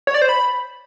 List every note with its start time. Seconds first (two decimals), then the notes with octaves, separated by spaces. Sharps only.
0.07 C#5
0.14 D5
0.22 C5
0.29 B5